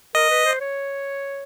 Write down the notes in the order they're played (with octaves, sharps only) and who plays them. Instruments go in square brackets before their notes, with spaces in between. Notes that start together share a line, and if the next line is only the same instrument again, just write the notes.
[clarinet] A#4 [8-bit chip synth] D#5
[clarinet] B4
C5
C#5